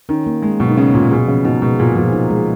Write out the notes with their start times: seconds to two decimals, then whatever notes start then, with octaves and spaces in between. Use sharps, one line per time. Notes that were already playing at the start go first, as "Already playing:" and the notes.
0.09 D#3 C#4
0.26 A#3
0.42 G#3 G#4
0.60 B2 F#3
0.69 D#3
0.77 C#3 C#4
0.94 A#2 A#3
1.11 B2 G#4
1.28 C#3 F3
1.45 B2 D#4
1.62 B2 G#3
1.79 A#2 G#4
1.96 A#2 F3
2.13 D#4
2.30 G#3